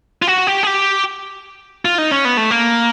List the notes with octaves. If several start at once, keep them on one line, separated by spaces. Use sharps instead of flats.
F4
F#4
G4
G#4
G4
F4
D#4
C#4
B3
A3
A#3